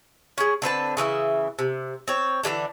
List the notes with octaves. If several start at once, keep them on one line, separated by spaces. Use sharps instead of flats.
C#4 G#4
D3 C4 B4 A5
C#3 E3 B4 E5
C3
C4 C#5
D3 E3 G#3 D4